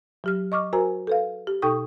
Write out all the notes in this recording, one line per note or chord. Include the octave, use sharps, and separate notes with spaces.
F#3 G4 F6
D#5 C#6 D6 F6
F#4 A#4 C5 G#5 A#5
A4 B4 F5
G4
B2 D#4 A4 G5 C#6 D#6